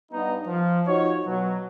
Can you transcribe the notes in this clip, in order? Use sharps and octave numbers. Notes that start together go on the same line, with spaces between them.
G2 B3 D#4
F3
D#4 F4 F#4 C#5
B2 F#3